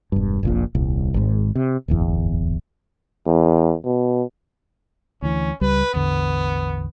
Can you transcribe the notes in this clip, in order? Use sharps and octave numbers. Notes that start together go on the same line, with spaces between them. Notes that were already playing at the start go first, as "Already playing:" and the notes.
E1 G2
F1 A#1 A#2
D#1 C2
G#1 G#2
C3
D1 G1 E2
E2
B2
D2 E3 C#4
C#2 G3 B4
A1 E2 D3 B3